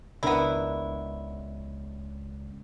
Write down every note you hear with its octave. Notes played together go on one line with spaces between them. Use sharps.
C#2 B3 D4 E4 A#4